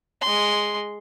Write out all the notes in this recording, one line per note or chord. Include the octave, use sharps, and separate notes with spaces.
G#3 C6